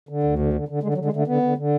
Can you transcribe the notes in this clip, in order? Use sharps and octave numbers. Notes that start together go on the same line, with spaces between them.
D3
D2
D3
D3
D3
D3 G#3
F#3
D3
G#3
D3 A3
D3 B3
D3
D3